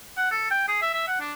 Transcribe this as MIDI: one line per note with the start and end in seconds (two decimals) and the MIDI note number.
0.17 0.31 78
0.31 0.49 69
0.51 0.64 79
0.68 0.81 68
0.82 0.89 76
0.93 1.07 76
1.07 1.19 78
1.20 1.33 62